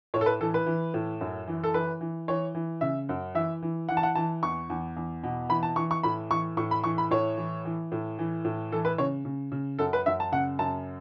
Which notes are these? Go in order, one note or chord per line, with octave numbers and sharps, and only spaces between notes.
A2 C#5
A4
B4
E3 A4
B4
E3
A2
F#2
E3
A4
E3 B4
E3
E3 C#5
E3
C#3 E5
F#2
E3 E5
E3
E3 F#5
A5
F#5
E3 A5
E2 C#6
E2
E2
B2
E3 B5
A5
E3 C#6
C#6
A2 B5
E3 C#6
A2 C#6
B5
E3 C#6
B5
A2 C#5
E3
E3
A2
E3
A2
E3 A4
B4
C#3 C#5
C#3
C#3
F#2 A4
B4
F#2 E5
A5
C#3 F#5
F#2 A5